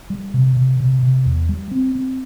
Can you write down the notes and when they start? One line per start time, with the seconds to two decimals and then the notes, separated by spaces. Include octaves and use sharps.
0.10 G3
0.34 C3
0.56 C3
0.80 C3
1.03 C3
1.26 E2
1.49 G3
1.71 C4
1.95 C4